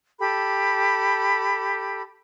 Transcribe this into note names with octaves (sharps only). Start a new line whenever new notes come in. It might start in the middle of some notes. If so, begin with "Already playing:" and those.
G4 A4 B5